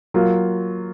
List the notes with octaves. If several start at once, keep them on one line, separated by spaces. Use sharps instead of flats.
F#3 A#3 F4